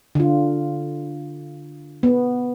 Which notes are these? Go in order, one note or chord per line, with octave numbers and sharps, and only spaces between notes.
D3 F4
B3